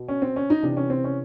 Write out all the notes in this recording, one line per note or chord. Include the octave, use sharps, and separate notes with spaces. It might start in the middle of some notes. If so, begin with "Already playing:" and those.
Already playing: B2
C#4
C4
C#4
D#4
C3 E3 D4
C#4
C4
C#4